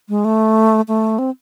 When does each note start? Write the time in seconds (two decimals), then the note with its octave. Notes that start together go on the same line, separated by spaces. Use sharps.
0.09 G#3
0.25 A3
0.88 A3
1.19 C4